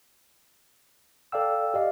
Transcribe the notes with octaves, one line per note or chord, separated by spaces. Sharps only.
A4 D5 F5 G5 E6
G4 D5 D#5 F5